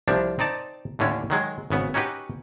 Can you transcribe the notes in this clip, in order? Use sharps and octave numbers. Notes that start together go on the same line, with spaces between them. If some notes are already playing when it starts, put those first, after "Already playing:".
C2 F3 G3 D4
C4 D#4 D5 A5
D#2 A2 D3 C#4 D4
D#3 F#3 G#3
G#1 C#3 B3
C#4 D#4 F#4 G4 B4